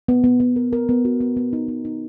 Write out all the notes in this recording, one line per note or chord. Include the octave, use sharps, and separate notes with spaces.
B3
B3
B3
A#4
A#4
B3
F#4
B3
B3
D#4
B3
D#4